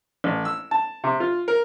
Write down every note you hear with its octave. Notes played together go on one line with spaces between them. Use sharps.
A1
E6
A5
C3
F4
A#4